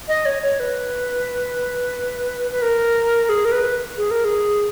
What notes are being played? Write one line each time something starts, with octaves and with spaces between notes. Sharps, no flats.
D#5
C#5
C#5
B4
B4
A#4
G#4
A#4
B4
G#4
A#4
G#4